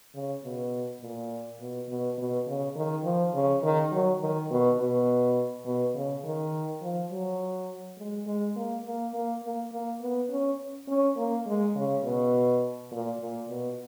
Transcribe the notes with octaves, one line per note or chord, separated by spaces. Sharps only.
C#3
B2
A#2
B2
B2
B2
C#3
D#3
F3
C#3
D#3
F#3
D#3
B2
B2
B2
C#3
D#3
F3
F#3
G#3
G#3
A#3
A#3
A#3
A#3
A#3
B3
C#4
C#4
A#3
G#3
C#3
B2
A#2
A#2
B2